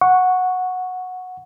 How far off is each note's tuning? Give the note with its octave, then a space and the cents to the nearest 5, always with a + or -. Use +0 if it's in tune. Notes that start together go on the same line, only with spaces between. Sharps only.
F#5 -10 C#6 +0